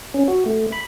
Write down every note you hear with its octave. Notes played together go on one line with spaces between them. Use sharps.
C#4
F#4
A3
B5